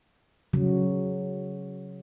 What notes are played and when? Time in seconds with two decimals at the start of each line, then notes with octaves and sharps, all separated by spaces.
0.53 C#3 F#3